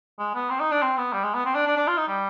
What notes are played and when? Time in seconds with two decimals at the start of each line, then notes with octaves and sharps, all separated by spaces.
0.19 G#3
0.34 B3
0.50 C4
0.60 D#4
0.72 D4
0.82 C4
0.97 B3
1.13 G3
1.24 G#3
1.34 B3
1.46 C4
1.55 D4
1.67 D4
1.77 D4
1.88 F4
1.97 D#4
2.08 G3